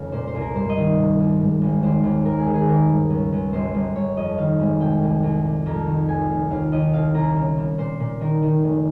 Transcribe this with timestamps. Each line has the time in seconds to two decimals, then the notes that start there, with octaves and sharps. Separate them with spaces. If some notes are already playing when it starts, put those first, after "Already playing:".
Already playing: F1 F2 C#3 F5
0.12 A#2 C5
0.27 C5
0.35 C2
0.41 A#4
0.55 G2 C5
0.69 D#5
0.77 D#3
0.98 C3
1.19 C2
1.40 G#2
1.62 G#1
1.83 D#2 C5
2.04 D#2
2.25 G#1 A#4
2.40 G#4
2.47 D#3
2.54 G#4
2.68 D#3 A#4
2.89 G2
3.10 C#2
3.32 C#2
3.53 G1 C5
3.74 G1
3.96 G1 C#5
4.17 F2 D#5
4.38 D#3 F5
4.59 G#1
4.80 C2 G5
5.02 C2
5.23 C2
5.44 A#2
5.66 F2 A#5
5.87 D#3
6.08 F1 G#5
6.30 F1
6.50 D#2 F5
6.72 D#2 D#5
6.93 C2 F5
7.14 C2 A#5
7.36 C#3
7.57 C#3
7.78 A#2 C5
8.00 A#2
8.21 D#3 A#4
8.42 D#3
8.63 F1